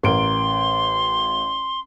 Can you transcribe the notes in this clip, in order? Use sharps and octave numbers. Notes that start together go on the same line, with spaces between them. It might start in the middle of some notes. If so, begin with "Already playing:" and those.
A1 A#4 C6 D7